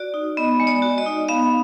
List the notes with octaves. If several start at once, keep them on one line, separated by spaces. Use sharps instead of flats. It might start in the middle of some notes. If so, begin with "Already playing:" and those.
Already playing: F#4 D5
D#4
B3 D#5
G#3
D5
F#4
D#5
D#4
B3 F5